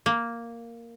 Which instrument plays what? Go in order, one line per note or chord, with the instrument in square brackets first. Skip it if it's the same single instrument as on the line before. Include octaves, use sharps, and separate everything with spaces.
[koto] A#3